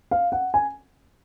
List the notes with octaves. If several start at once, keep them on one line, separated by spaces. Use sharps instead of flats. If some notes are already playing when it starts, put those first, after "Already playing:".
F5
F#5
G#5